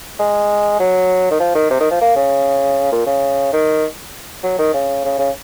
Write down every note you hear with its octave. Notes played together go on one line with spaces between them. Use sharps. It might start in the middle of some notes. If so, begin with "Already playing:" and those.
G#3
F#3
D#3
F3
D#3
C3
D#3
F3
A#3
C#3
A#2
C#3
D#3
F#3
D#3
C#3
C#3
C#3